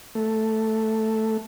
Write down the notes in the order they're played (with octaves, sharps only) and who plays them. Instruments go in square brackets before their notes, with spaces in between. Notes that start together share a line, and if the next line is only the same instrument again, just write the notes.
[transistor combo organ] A3